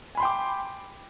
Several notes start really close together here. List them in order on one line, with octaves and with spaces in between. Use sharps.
G#5 B5 C6 G5 D6